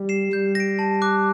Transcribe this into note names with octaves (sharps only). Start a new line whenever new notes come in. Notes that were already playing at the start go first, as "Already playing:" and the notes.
Already playing: G3
C7 E7
G3 G6
A#6 D7
A5
D6 F#6